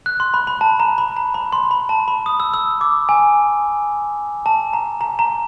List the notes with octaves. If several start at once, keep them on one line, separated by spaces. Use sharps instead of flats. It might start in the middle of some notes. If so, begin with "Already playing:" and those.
F#6
C6
B5
B5
A5
A#5
B5
A#5
B5
C6
B5
A5
B5
D#6
E6
E6
D6
G#5
A5
A#5
A#5
A#5